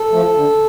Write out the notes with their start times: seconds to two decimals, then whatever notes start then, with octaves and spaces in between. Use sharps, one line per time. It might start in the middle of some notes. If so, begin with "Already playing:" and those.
Already playing: A4
0.11 F3 A3
0.34 D3